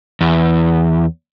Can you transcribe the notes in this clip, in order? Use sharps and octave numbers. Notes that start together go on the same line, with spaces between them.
E2